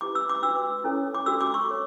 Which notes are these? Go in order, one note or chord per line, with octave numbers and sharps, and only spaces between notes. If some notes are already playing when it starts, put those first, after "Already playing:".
E4 G4 B4 D6
E6
D6
D4 F#4 B4 E6
C#4 E4 A4 C#5
D6
D4 F#4 A4 E6
D6
C#6
F#4 A4 C#5